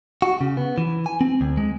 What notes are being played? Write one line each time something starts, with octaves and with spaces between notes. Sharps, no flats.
F#4
C#3
B3
E3
G#5
C4
D2
G#3